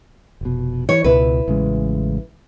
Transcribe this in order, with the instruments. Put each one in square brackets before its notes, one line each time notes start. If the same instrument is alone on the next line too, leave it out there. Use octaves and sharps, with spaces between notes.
[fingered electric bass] F1 B2
[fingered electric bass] E3 [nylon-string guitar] C#5
[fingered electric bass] C#2 B2 [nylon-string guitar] E4 B4
[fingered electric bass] A1 C#3 G#3